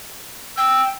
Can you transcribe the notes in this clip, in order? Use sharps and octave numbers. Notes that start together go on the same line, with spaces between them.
G5 E6